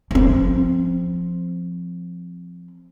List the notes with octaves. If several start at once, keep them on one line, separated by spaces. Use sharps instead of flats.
F3 C4